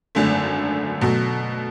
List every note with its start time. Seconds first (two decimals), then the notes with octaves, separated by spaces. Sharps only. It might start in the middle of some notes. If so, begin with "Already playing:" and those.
0.15 G#1 F#2 D3 A3
1.01 B2 F#3 A3